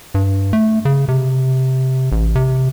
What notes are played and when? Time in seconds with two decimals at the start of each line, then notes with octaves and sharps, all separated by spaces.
0.14 G2
0.53 A3
0.85 C#3
1.08 C3
2.12 A1
2.35 C3